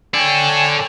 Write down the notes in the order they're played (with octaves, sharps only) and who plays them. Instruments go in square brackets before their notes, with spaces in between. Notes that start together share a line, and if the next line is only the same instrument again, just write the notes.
[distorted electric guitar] A4 D5 [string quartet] C#5 G5 G#5